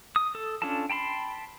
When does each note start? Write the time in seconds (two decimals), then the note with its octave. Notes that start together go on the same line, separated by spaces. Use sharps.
0.16 D#6
0.35 A4
0.62 C#4 D4 F4 A4 A5
0.90 G5 A5 B5 C6